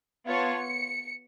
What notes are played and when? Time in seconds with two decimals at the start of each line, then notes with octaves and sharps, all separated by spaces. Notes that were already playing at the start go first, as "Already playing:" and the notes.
0.26 B3 F4 C#5 A5
0.59 C#7